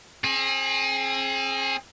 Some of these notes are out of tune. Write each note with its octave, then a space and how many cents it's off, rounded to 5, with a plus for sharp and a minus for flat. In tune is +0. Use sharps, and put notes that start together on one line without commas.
C4 +45 G#4 +15